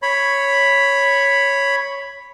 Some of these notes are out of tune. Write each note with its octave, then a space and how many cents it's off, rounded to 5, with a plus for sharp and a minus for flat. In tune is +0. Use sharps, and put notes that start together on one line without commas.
C#5 +0 B5 +0